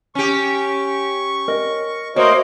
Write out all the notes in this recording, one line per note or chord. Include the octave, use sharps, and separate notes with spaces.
C#4 G4 C#6
A#4 D#5
A3 A#3 F#4 A#4 C5 C#5 D#5